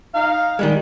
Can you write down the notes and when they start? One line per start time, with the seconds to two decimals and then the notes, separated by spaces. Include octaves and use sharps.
0.15 D#4 F5
0.59 D#3 G3 G#3